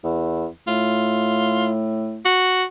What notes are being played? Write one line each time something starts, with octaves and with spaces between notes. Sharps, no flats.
E2
A2 F4
F#4